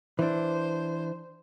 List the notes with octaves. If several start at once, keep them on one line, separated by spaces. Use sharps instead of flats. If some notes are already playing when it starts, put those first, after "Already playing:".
E3 D4 C5